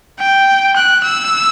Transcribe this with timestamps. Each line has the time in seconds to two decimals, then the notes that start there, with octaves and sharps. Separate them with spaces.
0.19 G5
0.76 F#6
1.04 E6